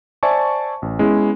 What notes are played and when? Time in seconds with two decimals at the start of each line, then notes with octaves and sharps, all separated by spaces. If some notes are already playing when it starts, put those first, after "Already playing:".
0.23 C5 D5 E5 G#5 A5 C#6
0.82 A1
0.99 G#3 B3 C#4 E4